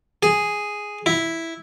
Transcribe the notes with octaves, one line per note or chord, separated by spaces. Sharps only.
G#4
E4